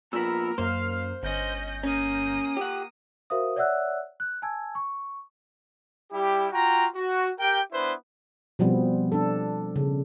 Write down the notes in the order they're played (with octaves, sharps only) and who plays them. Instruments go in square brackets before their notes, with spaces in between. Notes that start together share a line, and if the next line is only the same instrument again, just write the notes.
[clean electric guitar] A#2 F3 B3 [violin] A#4 [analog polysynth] B5 E6
[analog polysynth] F#2 A#3 [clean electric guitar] C5 [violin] F5 F6
[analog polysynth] G1 G6 A#6 [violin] C#4 D#5
[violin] A#3 D#6 [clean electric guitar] C#4
[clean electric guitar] G4 F#5
[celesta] F#4 A#4 C5 E5 F5 D#6
C#5 D5 E5 F#5 E6 F#6
F#6
G#5 A5 E6 G#6
C#6
[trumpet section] G3 E4 G4
F4 F#4 G5 A#5
F#4
G4 A#4 G5
B3 D4 E4 B4 C5
[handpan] B2 F3 G3 B3 C4
D4 A4
C#3